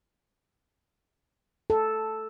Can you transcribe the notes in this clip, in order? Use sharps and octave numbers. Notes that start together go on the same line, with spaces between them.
A4